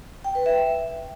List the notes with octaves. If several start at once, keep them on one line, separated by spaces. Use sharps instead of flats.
G5
B4
E5